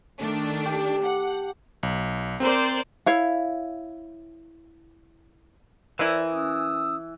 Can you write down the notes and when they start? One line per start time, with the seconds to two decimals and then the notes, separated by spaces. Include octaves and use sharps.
0.19 D#3 A3 D4
0.66 G4
1.03 D4 F#5
1.83 B1
2.40 C4 A#4 C5 D5
3.06 E4 C#5 F5
5.99 E3 E4 A#4 C5 D5
6.32 C#4 D#6 E6